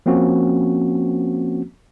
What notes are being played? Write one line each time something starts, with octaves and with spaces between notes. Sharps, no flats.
F3 A#3 C4 C#4 F#4